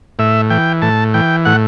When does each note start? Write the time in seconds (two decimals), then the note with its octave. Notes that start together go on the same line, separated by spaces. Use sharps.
0.19 A2 E5
0.50 E3 G5
0.82 A2 A5
1.14 E3 G5
1.45 A2 F#5